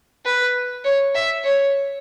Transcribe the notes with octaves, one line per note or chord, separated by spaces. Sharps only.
B4
C#5
E5
C#5